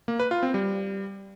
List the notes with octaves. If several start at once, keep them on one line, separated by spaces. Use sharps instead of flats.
A#3
B4
F4
C4
G3